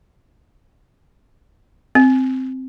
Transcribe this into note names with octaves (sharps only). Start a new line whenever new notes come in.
C4